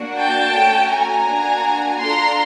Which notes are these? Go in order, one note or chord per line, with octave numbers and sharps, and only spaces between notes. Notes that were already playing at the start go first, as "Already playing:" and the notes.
Already playing: A#3 D4 F#4
G5 A5
A3 C#4 F#4
G#5 A#5
A#3 D4 F#4
D4 F4 A4 A#5 C6